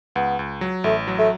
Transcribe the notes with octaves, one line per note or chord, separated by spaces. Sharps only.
C#2 B3
C#2
F#3
A1 A3
F#3
A3